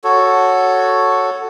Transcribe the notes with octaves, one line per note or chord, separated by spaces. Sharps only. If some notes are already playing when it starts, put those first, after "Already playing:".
F#4 A4 C#5